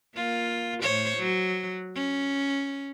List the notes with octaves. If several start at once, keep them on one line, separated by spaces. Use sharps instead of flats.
A#3 F4
A2 C5 C#5
F#3
C#4